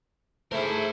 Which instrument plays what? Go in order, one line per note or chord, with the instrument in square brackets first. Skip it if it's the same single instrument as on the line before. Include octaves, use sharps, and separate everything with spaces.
[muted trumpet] A3 [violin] E4 [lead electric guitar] G#4 A#4 [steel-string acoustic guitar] C5 E5